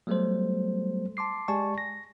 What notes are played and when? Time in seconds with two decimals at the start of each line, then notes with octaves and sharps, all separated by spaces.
0.07 F#3 G3 A3 B3 A4 C5
1.17 A5 C6 D6 C7
1.48 G#3 G4 D5 G#5 A5 C#6
1.78 A#6